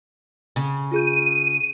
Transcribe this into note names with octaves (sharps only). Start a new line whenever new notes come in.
C#3
F4 G#4 G6 D#7